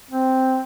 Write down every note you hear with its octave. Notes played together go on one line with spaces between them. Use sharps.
C4